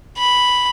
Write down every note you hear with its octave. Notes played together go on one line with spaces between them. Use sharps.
B5